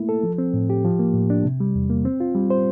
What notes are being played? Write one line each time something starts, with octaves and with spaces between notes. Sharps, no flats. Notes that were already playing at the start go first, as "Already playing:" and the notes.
Already playing: A3 A#3 E4
A4
F3
C4
A2
G4
F3
A#3
A2
D4
C3
G3
E2
A#3
C4
F4
G3
C5